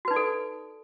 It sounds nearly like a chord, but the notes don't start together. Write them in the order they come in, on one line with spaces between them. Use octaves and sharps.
F#4 B4 D#4 D5 A4